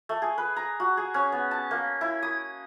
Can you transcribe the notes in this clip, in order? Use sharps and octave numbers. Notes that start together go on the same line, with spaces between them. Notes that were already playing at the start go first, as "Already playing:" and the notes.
A3
G#4
B4
A#5
F#4
G#4
C#4
B3
A5
A#3
E4
D#6